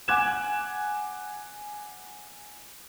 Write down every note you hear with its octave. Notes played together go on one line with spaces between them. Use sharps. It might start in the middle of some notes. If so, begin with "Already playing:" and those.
F#5 G#5 D6 F#6 G#6 E7